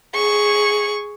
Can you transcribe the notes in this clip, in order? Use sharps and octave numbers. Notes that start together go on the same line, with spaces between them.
G#4 C#6